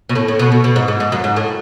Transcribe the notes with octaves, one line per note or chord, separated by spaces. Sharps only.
B2
A2
A2
B2
B2
B2
G#2
G#2
G#2
F#2
G#2
A2